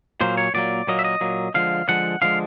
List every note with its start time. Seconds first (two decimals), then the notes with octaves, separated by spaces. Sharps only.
0.21 A#2 F#3 A#3 C5
0.37 C#5
0.54 A#2 F#3 A#3 D5
0.87 A#2 F#3 A#3 D#5
0.99 E5
1.04 D#5
1.21 A#2 F#3 A#3
1.54 D3 F3 G#3 F5
1.88 D3 F3 G#3 F#5
2.22 D3 F3 G#3 F5